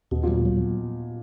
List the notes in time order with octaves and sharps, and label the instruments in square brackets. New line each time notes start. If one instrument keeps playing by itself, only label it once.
[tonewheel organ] D#2 [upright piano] B2
[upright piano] A#2
[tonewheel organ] F#3
F#3